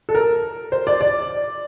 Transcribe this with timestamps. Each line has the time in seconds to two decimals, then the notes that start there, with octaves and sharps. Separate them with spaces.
0.09 A4
0.15 A#4
0.72 C5
0.87 D5
1.01 D5